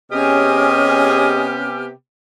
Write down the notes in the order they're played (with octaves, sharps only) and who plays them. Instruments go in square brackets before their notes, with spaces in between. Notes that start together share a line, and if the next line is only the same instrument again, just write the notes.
[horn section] C3 B3 G4 [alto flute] C#4 [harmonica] G#4 D#5 [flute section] G#5 F6